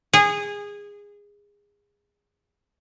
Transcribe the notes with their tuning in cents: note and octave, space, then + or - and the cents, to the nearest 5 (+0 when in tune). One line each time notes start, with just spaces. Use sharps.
G#4 -20